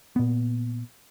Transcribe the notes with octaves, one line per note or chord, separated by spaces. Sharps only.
A#2 B3